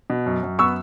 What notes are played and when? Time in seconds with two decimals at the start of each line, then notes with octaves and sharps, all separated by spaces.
0.10 B2
0.26 F#2
0.43 F#2
0.59 B3 C#6 E6